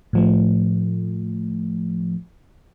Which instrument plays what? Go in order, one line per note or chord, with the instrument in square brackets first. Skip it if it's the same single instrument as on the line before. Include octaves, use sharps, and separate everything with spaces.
[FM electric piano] A2 F3 A3